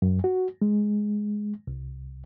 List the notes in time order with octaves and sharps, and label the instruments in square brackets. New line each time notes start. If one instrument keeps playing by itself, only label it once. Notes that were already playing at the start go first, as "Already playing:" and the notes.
[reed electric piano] F#2
F#4
G#3
C2